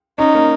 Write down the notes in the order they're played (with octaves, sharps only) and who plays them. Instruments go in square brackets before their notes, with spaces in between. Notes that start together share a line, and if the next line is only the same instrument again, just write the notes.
[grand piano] C#4 [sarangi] D#4
[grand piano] A#3